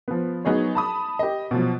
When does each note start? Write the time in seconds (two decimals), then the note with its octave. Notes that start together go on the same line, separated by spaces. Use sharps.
0.08 F3 B3
0.45 F#3 B3 D#4 G#4 C#5
0.75 A5 B5 D#6
1.19 G4 D#5
1.51 B2 F3 F#3